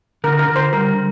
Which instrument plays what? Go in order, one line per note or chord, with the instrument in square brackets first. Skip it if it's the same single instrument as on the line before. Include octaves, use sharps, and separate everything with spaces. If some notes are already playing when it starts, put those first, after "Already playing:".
[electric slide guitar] D3 [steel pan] A#4
[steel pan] A#4
[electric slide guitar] D3
[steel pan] C5
[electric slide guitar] G3 [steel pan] A#4